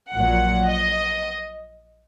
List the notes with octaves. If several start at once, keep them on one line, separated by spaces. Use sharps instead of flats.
A#1 A#2 F#3 F#5
D#5